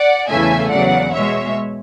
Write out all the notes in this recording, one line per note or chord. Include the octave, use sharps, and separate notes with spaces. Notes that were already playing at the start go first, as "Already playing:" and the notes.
Already playing: D5 F#5
E2 C#3 E3 A3 E5 G#5
E2 C#3 F#3 D5 F#5
B2 G#3 C#5 E5